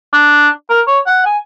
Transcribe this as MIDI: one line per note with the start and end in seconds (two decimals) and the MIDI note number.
0.13 0.49 62
0.70 0.81 70
0.87 0.99 73
1.06 1.24 78
1.25 1.38 80